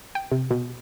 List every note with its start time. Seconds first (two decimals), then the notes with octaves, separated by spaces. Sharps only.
0.15 G5
0.32 C3
0.51 B2